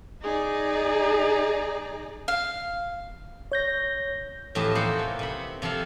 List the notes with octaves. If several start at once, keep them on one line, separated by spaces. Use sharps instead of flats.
D#4 G#4 D5 A#5
F5
C#5 G6 A#6
F2 A2 E3 G4 D#5 A5
E3 A#3 D#4 A4 C5 F#5
C3
C3 F#5 B5
C3 F3 A4 F5